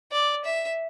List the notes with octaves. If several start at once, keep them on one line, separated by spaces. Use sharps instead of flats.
D5
E5